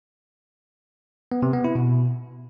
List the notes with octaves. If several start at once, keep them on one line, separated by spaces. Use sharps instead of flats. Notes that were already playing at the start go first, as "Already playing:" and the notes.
B3
C3
B3
E4
B2